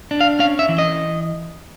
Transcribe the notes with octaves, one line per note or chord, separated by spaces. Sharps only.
D4
F5
C#4 F5
E5
E3
D#5